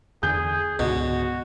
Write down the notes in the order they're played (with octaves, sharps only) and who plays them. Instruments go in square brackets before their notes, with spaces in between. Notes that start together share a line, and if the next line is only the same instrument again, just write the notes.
[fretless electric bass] E2 D3 [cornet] G#4 [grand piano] G6
[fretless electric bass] C#2 G#2 D3 [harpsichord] B2 [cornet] F#4